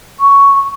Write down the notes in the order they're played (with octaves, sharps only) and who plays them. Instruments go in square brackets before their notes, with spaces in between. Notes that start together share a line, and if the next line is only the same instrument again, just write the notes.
[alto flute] C#6